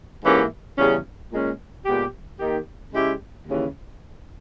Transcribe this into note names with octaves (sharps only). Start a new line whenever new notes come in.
G#2 E3 A#3 C#4 G4
E2 C#3 G3 C#4
A#2 G#3 C#4
A#2 G#3 B3 G4
D#3 A#3 D#4 G4
C#3 G#3 C#4 E4 G4
D#2 C#3 E3